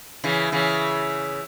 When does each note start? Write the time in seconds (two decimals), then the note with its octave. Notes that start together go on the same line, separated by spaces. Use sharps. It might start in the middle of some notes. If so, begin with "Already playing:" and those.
0.24 C#3 E3
0.52 C#3 E3